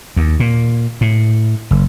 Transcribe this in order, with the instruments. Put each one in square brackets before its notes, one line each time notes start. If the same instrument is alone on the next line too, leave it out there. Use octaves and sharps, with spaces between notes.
[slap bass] D#2
A#2
A2
F#1